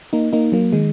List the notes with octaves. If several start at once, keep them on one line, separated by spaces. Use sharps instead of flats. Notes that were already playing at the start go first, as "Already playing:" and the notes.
A#3 D#4
A#3 D#4
F#3 A#3
D#3 G#3